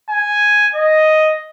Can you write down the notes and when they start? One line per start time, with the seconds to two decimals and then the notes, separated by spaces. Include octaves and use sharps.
0.10 G#5
0.75 D#5